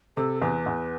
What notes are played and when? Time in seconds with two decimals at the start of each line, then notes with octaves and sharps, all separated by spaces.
0.17 C3 A4
0.42 E2 B4
0.66 E2